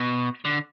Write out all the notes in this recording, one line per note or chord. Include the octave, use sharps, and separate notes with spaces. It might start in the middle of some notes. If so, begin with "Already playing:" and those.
Already playing: B2
D3